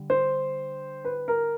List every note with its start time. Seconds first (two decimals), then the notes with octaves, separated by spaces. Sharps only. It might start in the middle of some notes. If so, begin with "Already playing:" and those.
Already playing: D3 G3
0.10 C5
1.05 B4
1.28 A#4